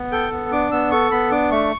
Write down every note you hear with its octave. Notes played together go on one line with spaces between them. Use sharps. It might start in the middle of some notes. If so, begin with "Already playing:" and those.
Already playing: B3
A4 G5
B3
D4 D6
B3 E6
A4 C#6
B3 B5
D4 D6
A3 C#6